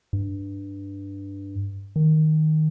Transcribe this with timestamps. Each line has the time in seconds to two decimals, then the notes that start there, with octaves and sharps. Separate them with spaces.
0.13 G2
1.96 D#3